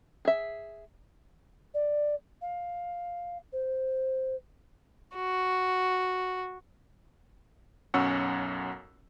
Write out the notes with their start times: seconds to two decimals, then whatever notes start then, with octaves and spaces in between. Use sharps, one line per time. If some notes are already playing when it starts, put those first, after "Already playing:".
0.25 G#4 E5
1.74 D5
2.42 F5
3.53 C5
5.15 F#4
7.94 B1 F#2 C#4 F#5 C#6 E6